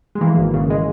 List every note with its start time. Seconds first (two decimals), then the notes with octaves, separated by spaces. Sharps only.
0.15 G#3
0.21 E3 A#3
0.37 G#1
0.54 C#3
0.70 G#3